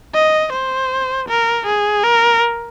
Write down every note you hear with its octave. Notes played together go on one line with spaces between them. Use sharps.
D#5
C5
A#4
G#4
A#4